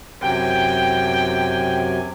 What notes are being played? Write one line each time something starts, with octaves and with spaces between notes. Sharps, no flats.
F#2 C3 G5 G#5